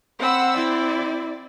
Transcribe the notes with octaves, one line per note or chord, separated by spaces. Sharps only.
C4 F#5 B5 E6
E4 D5